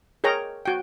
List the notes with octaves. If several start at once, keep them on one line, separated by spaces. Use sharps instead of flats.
G#4 A#4 C#5 G5 A#5
F#4 G5